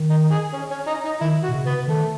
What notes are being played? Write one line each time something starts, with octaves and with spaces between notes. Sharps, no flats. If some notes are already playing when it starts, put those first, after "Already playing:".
Already playing: D#3
D#4
G#4
C#4
C#4
D#4
D#4
D#3 E4
F#4
B2
C#3
B3
D#3 A3